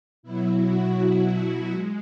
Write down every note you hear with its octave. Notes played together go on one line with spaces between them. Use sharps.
B2 F#3 E4
F#4
E4
G#3